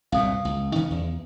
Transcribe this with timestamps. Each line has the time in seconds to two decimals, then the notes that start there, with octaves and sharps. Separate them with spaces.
0.12 C2 G2 A#2 F5 D#6
0.45 C#2
0.75 D#3 E3 C#4
0.90 E2